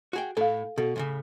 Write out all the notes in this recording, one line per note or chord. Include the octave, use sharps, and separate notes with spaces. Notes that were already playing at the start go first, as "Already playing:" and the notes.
F#4 G#4 G5
A2 A4 F5
B2 A4
E2 A2 C#3